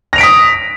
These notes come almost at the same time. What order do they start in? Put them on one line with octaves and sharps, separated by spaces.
A#6 F7 D7 B6 D#6